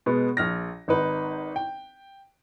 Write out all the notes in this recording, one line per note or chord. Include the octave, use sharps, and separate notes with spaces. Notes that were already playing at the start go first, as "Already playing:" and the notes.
B2 G#3 B3
A#1 F6 A#6
G#1 D#4 B4
G5